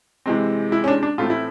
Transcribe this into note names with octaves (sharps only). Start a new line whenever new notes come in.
C3 E3 G#3 C4
E4
C#4
D4
D4
A2 E3 A3 C4 F4
E4